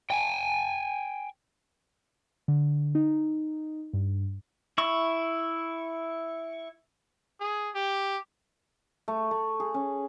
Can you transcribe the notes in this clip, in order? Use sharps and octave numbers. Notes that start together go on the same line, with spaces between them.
G5 G#5
D3
D#4
G2
E4 C#6
G#4
G4
A3
A3
G#4
C#4